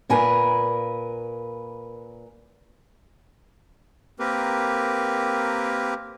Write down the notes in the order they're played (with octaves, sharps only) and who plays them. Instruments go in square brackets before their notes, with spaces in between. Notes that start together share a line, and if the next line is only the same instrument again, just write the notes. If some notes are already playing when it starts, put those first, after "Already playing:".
[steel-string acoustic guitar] A#2 A#4 B4 G#5
[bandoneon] A#3 C4 G4 A#4 B4